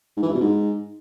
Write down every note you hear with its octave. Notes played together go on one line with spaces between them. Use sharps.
G#2
E3
G2
B2
G#2